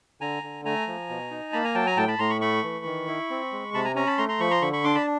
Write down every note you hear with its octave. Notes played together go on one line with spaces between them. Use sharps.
D3 G#5 A#5
D3
A3 G#5 A#5
F3
B2
D#4
A#3 A5 B5
G#5 A#5
F#3 G5 A5
G#5 A#5
A2 G5 A5
A5 B5
A2 A#5 C6
B5 C#6
A3 B5 C#6
E3
D#3
E4
C4
G#3
C3 A5 B5
G#5 A#5
C#4 G#5 A#5
A5 B5
A3 A#5 C6
A#5 C6
F3 B5 C#6
A#5 C6
D3 B5 C#6
B5 C#6
D4 C6 D6
A5 B5